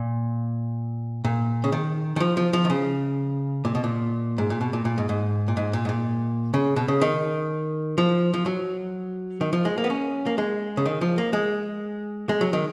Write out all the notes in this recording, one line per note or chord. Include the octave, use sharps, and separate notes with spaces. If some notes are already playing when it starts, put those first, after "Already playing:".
Already playing: A#2
A#2
C#3
D#3
D#3
F3
F3
F3
D#3
C#3
A#2
B2
A#2
G#2
A#2
B2
A#2
A#2
G#2
G#2
A#2
G#2
A#2
G#2
A#2
C#3
B2
C#3
D#3
F3
F3
F#3
D#3
F3
G#3
A#3
B3
C#4
A#3
G#3
C#3
D#3
F3
A#3
G#3
G#3
F#3
D#3